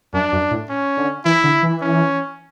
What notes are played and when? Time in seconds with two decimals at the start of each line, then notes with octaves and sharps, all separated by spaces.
0.13 F#2 D4
0.32 F#2
0.51 A2
0.69 C#4
0.97 D3
1.25 E3 E4
1.44 D3
1.63 E3
1.82 C#4